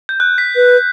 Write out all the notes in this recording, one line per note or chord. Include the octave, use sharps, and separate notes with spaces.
G6
F#6
B6
B4